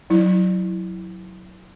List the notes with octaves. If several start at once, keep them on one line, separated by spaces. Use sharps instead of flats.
F#3 E4